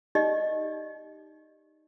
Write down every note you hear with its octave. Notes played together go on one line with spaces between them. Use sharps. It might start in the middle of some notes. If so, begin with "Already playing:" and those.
D#4 G4 D5 D#5